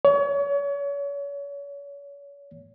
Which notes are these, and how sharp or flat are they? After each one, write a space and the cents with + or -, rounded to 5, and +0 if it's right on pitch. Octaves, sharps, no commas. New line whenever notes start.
C#5 +35